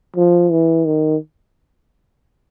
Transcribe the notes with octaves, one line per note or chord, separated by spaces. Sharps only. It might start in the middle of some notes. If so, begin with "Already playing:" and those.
F3
E3
D#3